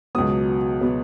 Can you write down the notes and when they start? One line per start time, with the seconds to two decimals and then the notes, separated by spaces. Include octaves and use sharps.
0.15 C#2 B2 F#3 B3 D#6
0.81 B2 F#3 B3